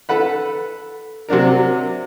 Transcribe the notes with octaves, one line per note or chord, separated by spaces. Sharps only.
A4 B4 F#5 B5
C3 F#3 D4 A#4